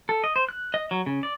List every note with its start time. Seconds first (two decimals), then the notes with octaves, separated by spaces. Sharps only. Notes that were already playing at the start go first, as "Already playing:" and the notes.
0.09 A4
0.24 D#5
0.36 C5
0.49 F#6
0.74 D#5
0.91 F#3
1.06 C#3
1.23 D5